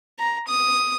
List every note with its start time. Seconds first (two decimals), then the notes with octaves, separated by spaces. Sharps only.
0.19 A#5
0.47 D#6